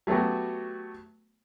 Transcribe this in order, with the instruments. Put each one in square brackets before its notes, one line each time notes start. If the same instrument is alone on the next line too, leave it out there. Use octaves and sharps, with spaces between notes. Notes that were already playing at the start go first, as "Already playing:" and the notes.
[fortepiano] F#3 A3 B3 F#4 G4